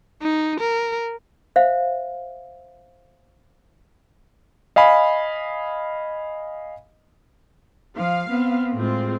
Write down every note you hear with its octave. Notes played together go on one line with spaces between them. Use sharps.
D#4
A#4
C5 E5 F5
D#5 F5 G#5 B5
F3 F5
B3 C4
A2 G#3 C4 F4